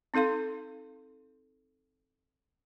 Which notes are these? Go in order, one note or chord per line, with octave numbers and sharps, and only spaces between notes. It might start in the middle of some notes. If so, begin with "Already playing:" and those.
C4 D#4 A4 F5 C6